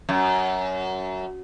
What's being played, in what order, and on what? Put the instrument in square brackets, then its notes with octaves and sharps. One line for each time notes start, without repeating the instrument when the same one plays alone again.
[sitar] F#2